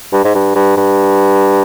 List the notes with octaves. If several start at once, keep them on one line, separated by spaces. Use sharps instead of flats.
G2
G#2
G2
G2
G2